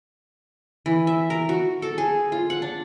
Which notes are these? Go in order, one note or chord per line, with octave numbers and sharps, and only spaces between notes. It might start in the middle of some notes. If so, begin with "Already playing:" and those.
E3
E5
A#4
F#4
A4
G#4
F4
F#5
D4